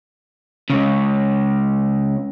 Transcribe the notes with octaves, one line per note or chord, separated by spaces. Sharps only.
C#2 C#3